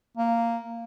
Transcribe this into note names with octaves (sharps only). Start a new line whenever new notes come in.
A#3